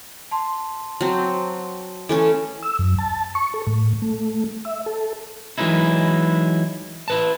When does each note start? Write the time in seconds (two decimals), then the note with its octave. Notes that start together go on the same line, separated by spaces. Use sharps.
0.31 A5 C6
1.01 F#3 C4
2.09 E3 A3 C#4 A4
2.62 E6
2.79 F#2
2.99 A5
3.35 C#6
3.54 A4
3.67 A2
4.02 A3
4.65 E5
4.86 A4
5.58 E3 F#3 G#3 D#4 E4
7.08 E4 B4 A5